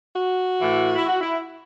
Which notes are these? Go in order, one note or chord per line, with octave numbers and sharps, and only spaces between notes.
F#4
A2 E3
E4
F#4
E4